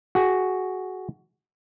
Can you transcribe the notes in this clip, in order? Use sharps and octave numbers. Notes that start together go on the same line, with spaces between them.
F#4 G#4